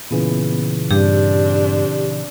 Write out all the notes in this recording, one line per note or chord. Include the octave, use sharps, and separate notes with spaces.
A#2 C#3 E3 B3
G2 C4 D4 G4